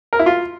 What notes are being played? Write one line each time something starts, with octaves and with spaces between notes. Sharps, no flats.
A#4
E4
F4